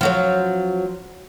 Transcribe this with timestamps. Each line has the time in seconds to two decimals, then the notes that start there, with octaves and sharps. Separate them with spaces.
0.01 F3 F#3 C#4